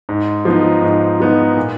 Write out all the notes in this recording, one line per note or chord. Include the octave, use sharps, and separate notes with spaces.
G#2
F3 B3 D#4
G#2
F3 B3 D#4
A#2